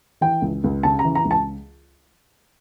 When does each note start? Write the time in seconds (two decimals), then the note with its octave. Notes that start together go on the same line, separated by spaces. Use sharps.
0.21 E3 G5
0.42 C#2
0.64 C#2
0.83 C#3 A5
0.99 A#5
1.05 E3
1.15 A#5
1.25 C#2
1.31 A5